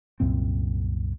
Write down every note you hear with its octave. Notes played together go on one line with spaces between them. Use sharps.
C2 F#2 A#2 C4